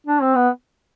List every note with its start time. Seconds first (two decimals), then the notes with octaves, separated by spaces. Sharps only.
0.07 D4
0.21 C4
0.35 B3